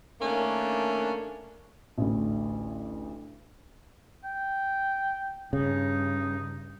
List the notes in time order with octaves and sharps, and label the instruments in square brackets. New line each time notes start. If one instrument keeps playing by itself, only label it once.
[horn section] D#3 A3 A#3 C#4 D4
[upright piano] A1 D2
[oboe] G5
[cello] G2 [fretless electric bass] C#3 [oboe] D#4